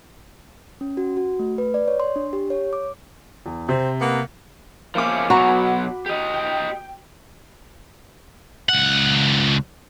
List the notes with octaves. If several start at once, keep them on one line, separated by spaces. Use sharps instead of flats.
C#4
F#4
F#4
A3
B4
D5
C#5
C6
D4
G4
C#5
D6
E2
C3 C4
A#3 B3 F#5
F3 A#3 C#4 E5 D6
B2 F#3 F#4 G#5 A#5 B5
B5
G4 D#5
G5
C#2 F#5